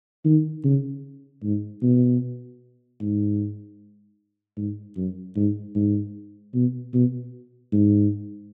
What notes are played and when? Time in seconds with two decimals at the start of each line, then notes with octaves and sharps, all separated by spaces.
0.25 D#3
0.64 C#3
1.43 G#2
1.82 B2
3.01 G#2
4.57 G#2
4.97 F#2
5.36 G#2
5.75 G#2
6.54 B2
6.94 B2
7.72 G#2